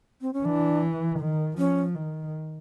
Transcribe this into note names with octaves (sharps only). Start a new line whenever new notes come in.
C4
C#4
E3 D4
D#3
F3 C#4
D#3